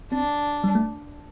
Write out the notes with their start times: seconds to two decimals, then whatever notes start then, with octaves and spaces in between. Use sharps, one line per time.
0.12 C4 D4
0.64 G3
0.75 A3